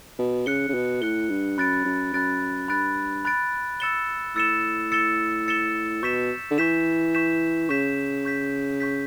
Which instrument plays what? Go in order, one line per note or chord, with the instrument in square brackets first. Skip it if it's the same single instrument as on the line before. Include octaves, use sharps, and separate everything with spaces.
[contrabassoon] B2
[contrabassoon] C#3 [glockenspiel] F#6 C#7 G7
[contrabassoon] C#3
B2
[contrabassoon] A2 [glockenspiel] F#6 C#7 G7
[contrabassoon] G2
[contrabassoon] F#2 [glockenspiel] B5 F#6 A6 D7
[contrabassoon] F#2
[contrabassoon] F#2 [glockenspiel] B5 F#6 A6 D7
[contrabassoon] G2 [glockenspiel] B5 F#6 A6 D7
[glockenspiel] B5 F#6 A6 D7
E6 A6 C#7 E7 G7
[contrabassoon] A2 [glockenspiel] E6 A6 C#7 E7 G7
[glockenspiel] E6 A6 C#7 E7 G7
E6 A6 C#7 E7 G7
[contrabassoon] B2 [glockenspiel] C#6 G6 B6 E7
[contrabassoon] D3
[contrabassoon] E3 [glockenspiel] C#6 G6 B6 E7
[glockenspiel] C#6 G6 B6 E7
[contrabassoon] C#3 [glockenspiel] C#6 G6 B6 E7
[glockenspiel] C#6 G6 B6
C#6 G6 B6